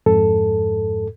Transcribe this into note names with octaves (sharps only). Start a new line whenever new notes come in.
F2 G#2 A4